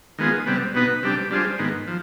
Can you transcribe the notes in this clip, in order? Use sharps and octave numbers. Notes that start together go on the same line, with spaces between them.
D#3 G#3 B3 F4 G#4
C3 G3 B3
B2 B3 D#4 B4
C3 G3 D4 G4
G3 D4 F4 G#4 C5
G#2 D#3 B3
F3